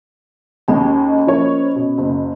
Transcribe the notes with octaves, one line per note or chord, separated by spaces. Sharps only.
D#2 G#3 C#4 D#5 B5
F3 A#3 C#5
B2
F#1